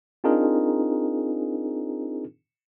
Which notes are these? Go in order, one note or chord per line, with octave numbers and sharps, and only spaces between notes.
C4 D4 D#4 F4 G#4 A#4